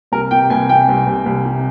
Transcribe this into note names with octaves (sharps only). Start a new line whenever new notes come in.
C2 A#4
C3 G5
C2 G#5
C3 G5
C2
C2
C2
C3